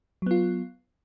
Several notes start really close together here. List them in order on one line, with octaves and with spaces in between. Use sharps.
F#3 B3 F4